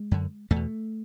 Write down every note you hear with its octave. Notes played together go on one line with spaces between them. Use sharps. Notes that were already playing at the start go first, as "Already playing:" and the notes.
Already playing: G#3
F#2 D3
E2 A3
B2